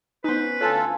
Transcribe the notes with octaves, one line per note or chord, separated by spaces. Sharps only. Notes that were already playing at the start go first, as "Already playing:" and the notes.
B3 C#4 D#4 B4 C5
D2 F4 A4 C#5 G#5 A5 F#6